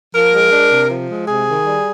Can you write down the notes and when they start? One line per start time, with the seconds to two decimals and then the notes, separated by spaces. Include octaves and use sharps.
0.15 F3 A#4
0.34 G#3
0.52 D4
0.71 C3
0.91 F3
1.09 G#3
1.28 C3 G#4
1.48 D#3
1.66 G3